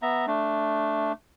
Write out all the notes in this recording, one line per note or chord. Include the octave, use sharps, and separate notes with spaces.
B3 E5 A#5
A3 D4